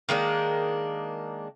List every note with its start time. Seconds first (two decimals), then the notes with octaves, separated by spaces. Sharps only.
0.09 D#3 G#3 A#3 D4